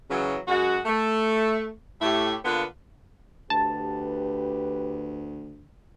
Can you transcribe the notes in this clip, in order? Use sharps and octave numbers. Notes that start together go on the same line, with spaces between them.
C#3 E3 F#3
F#2 G#3 F#4
A3
A2 A3 E4 G4
D3 A#3 B3 F4 B4
D2 G4 B4 A5